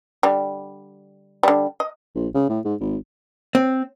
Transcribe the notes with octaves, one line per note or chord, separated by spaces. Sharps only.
D3 G3
D3 G3
D#5
A#1
C#3
A2
G#2
G#1
C4